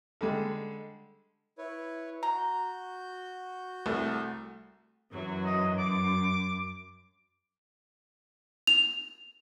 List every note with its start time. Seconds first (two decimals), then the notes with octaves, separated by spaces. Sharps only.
0.21 D3 G3 G#3
1.58 E4 B4 C#5
2.23 F#4 A#5 G6
3.86 C2 A3
5.11 F#2 E3 F#3
5.45 D#5
5.78 F#2 D6
8.67 F7